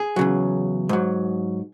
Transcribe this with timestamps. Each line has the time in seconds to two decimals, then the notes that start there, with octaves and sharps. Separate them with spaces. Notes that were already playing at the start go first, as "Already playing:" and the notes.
Already playing: G#4
0.16 E2 C#3 F#3
0.89 G#2 F#3